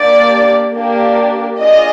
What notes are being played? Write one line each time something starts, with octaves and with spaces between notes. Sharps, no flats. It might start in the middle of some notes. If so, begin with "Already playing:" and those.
Already playing: A#3 D4 G4 D5
A#3 D4 G4
D4 F4 G#4 D#5